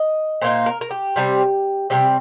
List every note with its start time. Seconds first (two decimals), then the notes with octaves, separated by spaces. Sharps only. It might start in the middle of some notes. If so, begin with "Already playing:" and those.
Already playing: D#5
0.41 A#2 A#3 D#4 C5
0.66 A#4
0.81 A#4
0.91 G4
1.16 C3 G3 C4
1.90 C3 G3 C4 G4